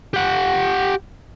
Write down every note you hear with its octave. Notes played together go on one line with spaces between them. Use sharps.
G4 F#5